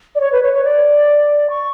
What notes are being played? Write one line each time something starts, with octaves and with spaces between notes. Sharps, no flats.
D5
C#5
B4
C#5
C#5
D5
C#6